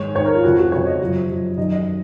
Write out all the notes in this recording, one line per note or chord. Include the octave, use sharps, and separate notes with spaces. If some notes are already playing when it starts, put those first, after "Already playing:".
Already playing: G#2 D#3 C#5
G#2 D#3 C#5
A#4
F4
F2 C#3 F3 F#4
F#4
F2 C#3 F3 C#5
D#5
F#2 F3
F#2 F3
F#2 D#3 D#5
D#5